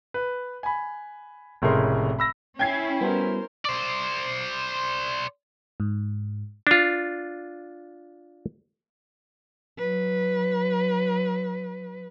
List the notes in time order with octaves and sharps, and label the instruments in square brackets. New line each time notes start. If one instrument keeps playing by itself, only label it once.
[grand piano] B4
G#5 B5
F1 A2 C#3 G#3 A#4 C6
B5 E6 A#6
[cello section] C#4 E4 [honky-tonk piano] G5 G#6 C7
[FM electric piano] G3 B3 F#4 [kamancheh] A#4 C5
[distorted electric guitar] C5 D5
[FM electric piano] G#2
[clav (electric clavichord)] D4 F4
[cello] F#3 B4